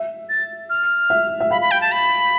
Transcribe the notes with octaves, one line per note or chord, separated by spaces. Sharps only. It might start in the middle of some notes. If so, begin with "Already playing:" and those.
Already playing: E5
A6
F6
E5
E5
F5 B5
B5
G5
A5
B5